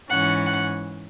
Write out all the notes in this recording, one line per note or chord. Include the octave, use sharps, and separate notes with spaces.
G#2 E3 C#4 F#5
F#5